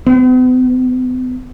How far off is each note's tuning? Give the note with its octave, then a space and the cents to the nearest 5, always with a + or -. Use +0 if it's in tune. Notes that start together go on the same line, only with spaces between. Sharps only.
B3 +45